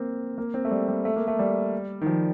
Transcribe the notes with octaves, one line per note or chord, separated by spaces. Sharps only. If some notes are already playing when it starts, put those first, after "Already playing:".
Already playing: A#3 C4
A#3
C4
A3
G3
G3
A3
A#3
A3
G3
D#3
F3